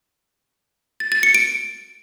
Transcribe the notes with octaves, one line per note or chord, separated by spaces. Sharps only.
A6
A6
C#7
D7